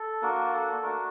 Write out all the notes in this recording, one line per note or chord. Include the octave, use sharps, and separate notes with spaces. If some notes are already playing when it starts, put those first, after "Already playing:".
Already playing: A4
A#3 D4 F#4 A#4
A4
A3 D4 F#4 A#4